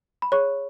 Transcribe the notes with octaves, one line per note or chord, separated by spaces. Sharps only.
B5
G#4 C#5 C#6